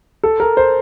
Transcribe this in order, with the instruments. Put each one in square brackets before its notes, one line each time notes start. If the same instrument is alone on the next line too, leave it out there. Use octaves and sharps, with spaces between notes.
[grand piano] A4
A#4
C5